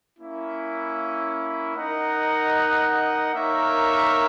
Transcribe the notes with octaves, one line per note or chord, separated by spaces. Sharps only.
A#3 C#4 E4
D#4 A#4 D#5 F#5
A#3 D#4 A#4 C#5 E5